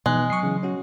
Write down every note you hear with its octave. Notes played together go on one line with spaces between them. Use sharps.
B2 E3 F3 G#3 B3 D#4 F#6
F#3 C#6 D#6 C7
C#3 E3
C#4 F#4